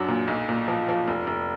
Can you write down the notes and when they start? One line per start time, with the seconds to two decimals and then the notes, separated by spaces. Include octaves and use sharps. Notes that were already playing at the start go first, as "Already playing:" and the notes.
Already playing: F#2 F#3 D4
0.08 A#2
0.28 B1
0.49 A#2
0.68 F3
0.88 F3
1.08 F1
1.27 F1